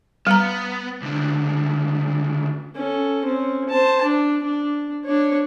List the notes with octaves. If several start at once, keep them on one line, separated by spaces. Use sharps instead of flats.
G3 B3 A#5
C#2 D3
C#4 A4
C4 C#4
C5 A5
D4
D4
D4 C#5